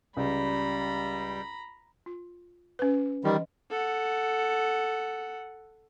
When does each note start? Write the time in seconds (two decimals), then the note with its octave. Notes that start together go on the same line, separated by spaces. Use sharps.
0.17 C#2 G3 A#5 B5
2.06 F4
2.79 C#4 B4
3.24 D#3 E3 G3 D#5
3.70 A4 F#5